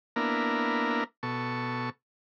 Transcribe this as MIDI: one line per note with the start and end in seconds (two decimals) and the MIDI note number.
0.16 1.04 58
0.16 1.04 59
0.16 1.04 62
0.16 1.04 64
0.16 1.04 70
1.23 1.90 47
1.23 1.90 69
1.23 1.90 85